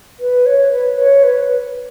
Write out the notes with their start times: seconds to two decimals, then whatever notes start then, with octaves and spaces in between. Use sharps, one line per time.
0.20 B4
0.46 C#5
0.72 B4
0.98 C#5
1.24 B4